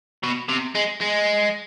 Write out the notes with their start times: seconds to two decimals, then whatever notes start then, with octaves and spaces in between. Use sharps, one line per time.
0.23 B2
0.48 C3
0.75 G#3
1.01 G#3